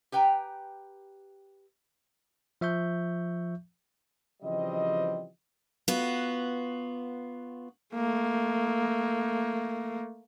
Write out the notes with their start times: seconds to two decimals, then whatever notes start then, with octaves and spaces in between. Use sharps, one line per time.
0.12 G4 B4 G5 G#5 A#5
2.61 F3 E5 C#6 G6
4.43 C#3 E3 F3 G3 C4 D#5
5.88 B3 F4 F#4
7.95 A3 A#3